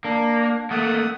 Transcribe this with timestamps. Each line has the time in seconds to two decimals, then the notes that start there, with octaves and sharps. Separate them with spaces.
0.05 A#3 D4
0.71 A3 A#3 F#5 D#6